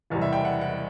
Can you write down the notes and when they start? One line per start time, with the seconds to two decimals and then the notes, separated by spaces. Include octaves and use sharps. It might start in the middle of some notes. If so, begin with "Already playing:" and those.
0.10 F#1 E2 C3 G3
0.22 E5
0.33 G5
0.45 F#5
0.61 F#5